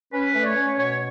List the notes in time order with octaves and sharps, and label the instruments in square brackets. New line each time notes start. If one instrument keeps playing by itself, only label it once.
[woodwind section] C#4 B4
A3
D5
C#5
C#4
B2 C#5